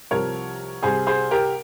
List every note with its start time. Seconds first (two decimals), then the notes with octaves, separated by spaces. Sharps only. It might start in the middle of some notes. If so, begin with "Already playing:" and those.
0.11 C2 C3 F3 A#4 C#5
0.82 C2 C3 G3 G#4 C5
1.07 G#4 C5
1.31 G4 A#4